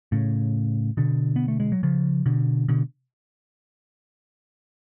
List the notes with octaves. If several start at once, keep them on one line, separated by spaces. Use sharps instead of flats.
A2 C#3
B2 D3
B3
A3
G#3
F#3
C#3 F3
B2 D3
B2 D3